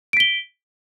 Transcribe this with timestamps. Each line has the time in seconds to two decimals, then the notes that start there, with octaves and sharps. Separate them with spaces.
0.13 D7
0.17 B6
0.20 G7